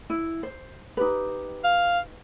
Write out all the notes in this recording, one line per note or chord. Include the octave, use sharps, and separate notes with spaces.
E4
C5
D#4 G4 B4
F5